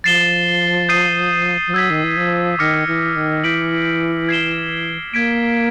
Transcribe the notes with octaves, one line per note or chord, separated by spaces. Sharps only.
F3 A6 C7 E7 G7
D#6 G6 C7 D#7
F3
F#3 E6 G#6 B6
D#3
E3
F3
D#3 D6 F6 A#6 C#7
E3
D#3
E3 G6 B6 D7 F#7
G#6 C7 E7 G7
A#3 G#6 B6 D7